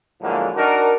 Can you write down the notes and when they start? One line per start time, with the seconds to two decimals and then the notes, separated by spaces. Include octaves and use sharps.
0.21 A2 D3 F3 F#3 G#3 A#3
0.56 D4 D#4 F#4 A#4